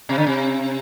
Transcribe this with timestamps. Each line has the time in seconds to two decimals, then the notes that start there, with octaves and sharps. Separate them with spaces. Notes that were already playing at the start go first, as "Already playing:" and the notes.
0.09 C3
0.18 D3
0.27 C3